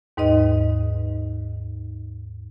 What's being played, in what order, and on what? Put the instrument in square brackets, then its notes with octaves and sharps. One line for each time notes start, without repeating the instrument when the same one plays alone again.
[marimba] D#2 G#2 D#4 B4 D#5